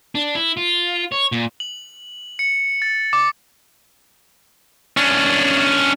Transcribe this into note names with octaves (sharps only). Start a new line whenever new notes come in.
D4
E4
F4
C#5
A#2
F#7
C#7
A6
D6
C#4 D4